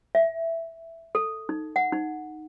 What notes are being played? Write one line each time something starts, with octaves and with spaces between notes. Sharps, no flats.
E5
A4
D#4
F#5
D#4